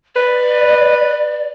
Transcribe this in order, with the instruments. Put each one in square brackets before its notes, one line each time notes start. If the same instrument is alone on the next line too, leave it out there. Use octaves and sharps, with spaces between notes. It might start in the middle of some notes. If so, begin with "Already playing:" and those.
[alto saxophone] B4 [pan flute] D5